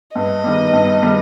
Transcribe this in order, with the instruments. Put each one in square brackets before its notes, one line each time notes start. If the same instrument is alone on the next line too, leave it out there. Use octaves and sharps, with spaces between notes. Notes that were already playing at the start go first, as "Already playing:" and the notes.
[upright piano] G2 [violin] D#5
[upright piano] D#3 G3
G2
D#3 G3